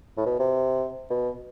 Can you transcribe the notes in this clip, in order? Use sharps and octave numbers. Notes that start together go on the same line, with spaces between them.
A2
B2
C3
B2